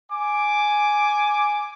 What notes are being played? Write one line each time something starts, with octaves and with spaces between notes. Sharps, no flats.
G#5 D6